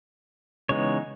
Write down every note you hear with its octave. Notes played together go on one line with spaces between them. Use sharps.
C#3 E3 G#3 B3 D#4 C#5